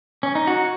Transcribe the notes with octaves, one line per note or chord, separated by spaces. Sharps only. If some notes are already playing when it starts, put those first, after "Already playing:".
C#4
D#4
F#4